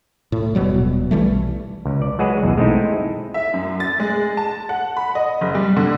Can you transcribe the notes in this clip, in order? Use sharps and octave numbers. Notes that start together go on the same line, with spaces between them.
A2
D#1 B2 F#3 G3
B1 E3 G3 A3
C#2
D5
F#3 G#3 F#4 G#4 B4 F#5
B1 E2
G#3 A3 C4 D#4 E4
E5
F#2
A6
G#3
A5
F#5
B5
D#5
F#1
G3
D3